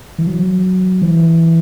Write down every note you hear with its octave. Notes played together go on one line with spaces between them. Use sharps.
E3
F#3
E3